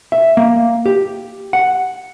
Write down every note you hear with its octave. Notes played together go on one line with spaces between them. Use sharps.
E5
A#3
G4
F#5